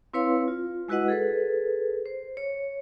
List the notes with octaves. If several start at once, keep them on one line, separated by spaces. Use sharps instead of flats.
C4 E4 B4 C#5 F5 C6
F4
G#3 E4 F#4 B4 D#5 F#5
G#4 A4 B4
C5
C#5